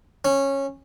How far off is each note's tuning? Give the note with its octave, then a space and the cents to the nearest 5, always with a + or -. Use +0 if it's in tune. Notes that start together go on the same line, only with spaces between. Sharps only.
C#4 -15